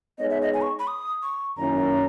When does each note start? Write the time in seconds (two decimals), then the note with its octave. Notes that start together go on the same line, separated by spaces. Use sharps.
0.18 G#3 B3 D#4 G#4 C#5 D#5
0.30 E5
0.42 D#5
0.54 G#5
0.62 C#6
0.79 B5
0.87 D#6
1.23 C#6
1.56 F#2 D#3 A#3 C#4 E4 A#5